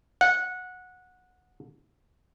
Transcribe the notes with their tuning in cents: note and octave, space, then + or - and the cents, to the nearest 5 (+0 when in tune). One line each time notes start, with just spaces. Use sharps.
F#5 -15